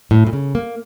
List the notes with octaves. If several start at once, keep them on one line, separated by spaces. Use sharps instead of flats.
A2
A#2
C#3
A#3